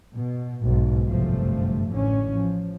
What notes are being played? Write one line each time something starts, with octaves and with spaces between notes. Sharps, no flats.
B2
B1 G#2
G1 F#2 C3 F3 A3
A1 D3 C#4
F3